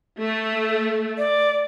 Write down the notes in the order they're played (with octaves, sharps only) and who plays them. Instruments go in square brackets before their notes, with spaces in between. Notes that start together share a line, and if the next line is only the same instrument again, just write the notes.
[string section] A3
[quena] D5